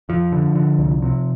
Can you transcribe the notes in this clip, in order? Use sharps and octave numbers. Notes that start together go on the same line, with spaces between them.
F2 F3
D3
D3
C2
C3